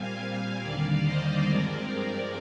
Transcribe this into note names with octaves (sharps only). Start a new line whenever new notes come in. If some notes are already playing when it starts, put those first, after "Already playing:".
Already playing: A#2 G3 C4 F5 G#5
F5 G#5
D#2 D3 G3 A#3 D5 F5
C5 D#5
G2 F3 G#3 C4 A#4 D5
A#4 D5